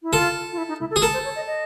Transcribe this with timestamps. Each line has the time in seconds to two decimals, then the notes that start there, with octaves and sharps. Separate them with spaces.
0.03 E4
0.13 F4 A4
0.53 F4
0.58 E4
0.68 D#4
0.80 E4
0.91 A4
0.96 G#4
1.02 A4 A#4
1.13 C5
1.24 C#5
1.36 D#5
1.47 D#5